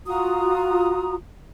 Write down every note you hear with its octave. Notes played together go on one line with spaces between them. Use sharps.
F4 F#4 A#5 D#6